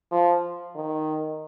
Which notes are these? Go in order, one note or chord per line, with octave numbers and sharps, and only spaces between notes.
F3
D#3